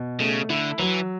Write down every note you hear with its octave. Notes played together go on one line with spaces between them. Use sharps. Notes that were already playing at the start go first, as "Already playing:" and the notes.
Already playing: B2
C#3 A3
D3 E4
E3 F#3